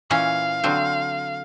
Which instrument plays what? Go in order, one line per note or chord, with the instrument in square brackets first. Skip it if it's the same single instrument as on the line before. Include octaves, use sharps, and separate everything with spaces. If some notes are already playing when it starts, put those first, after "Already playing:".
[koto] A#2 E3 C#4 [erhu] F5
[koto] D3 F#3 C4